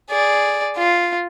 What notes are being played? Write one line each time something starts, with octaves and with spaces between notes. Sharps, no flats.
G#4 D5
F4